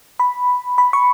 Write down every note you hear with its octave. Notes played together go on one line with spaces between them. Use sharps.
B5
B5
C#6